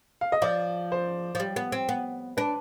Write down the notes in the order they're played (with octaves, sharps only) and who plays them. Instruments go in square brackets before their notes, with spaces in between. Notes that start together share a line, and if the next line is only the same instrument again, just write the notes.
[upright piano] F5
D#5
[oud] F3 [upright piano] D5
[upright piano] C5
[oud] F3
G3
B3
C4
B3
[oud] D4 [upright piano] B4